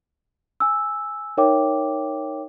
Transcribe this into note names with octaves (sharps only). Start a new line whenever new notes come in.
G#5 E6
D#4 A#4 C#5 E5 G5 D6